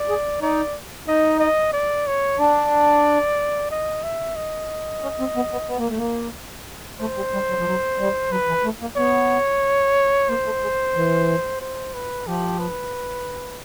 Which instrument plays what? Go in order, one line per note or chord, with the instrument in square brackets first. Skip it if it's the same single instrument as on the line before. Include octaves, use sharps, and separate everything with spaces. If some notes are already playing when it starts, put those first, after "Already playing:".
Already playing: [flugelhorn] D5
[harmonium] G#4
[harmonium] D#4 [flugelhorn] D5
[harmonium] D#4 [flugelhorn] D#5
[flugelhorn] D#5
D5
C#5
[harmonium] D4 [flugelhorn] D5
[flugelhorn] D#5
E5
D#5
[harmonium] C#4
C4
B3
B3
B3
A#3
A3
A#3
[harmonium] A3 [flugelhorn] C5
[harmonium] G3
G3
F#3
F3
F#3
G3
[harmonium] F#3 [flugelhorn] B4
[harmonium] E3
A3
A#3
[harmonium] B3 [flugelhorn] C#5
[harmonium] A#3 [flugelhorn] C5
[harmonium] A3
G#3
E3
[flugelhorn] C5
B4
[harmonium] F3 [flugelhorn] G4
[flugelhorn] B4